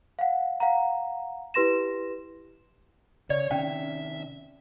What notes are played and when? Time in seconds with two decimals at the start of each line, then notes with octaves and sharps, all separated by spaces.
0.19 F5 F#5
0.60 F5 F#5 A#5
1.54 E4 G4 B4 C6 A#6 E7
3.30 C#3 C#5 D5
3.51 C3 D#3 C#4 E5 G5